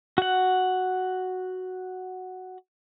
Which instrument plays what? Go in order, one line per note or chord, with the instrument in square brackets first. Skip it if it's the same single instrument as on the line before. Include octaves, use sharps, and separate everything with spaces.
[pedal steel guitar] F#4 F#5